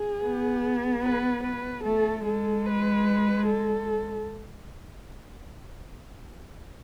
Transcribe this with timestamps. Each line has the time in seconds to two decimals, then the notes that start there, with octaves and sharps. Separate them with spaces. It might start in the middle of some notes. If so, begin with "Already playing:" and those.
Already playing: G#4
0.22 B3
1.04 B4
1.43 B4
1.84 A3 A4
2.26 G#3 A4
2.66 B4
3.47 A4